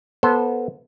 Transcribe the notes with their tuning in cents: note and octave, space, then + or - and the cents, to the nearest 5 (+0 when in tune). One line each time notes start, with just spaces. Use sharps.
B3 -15 A4 +0 C5 +0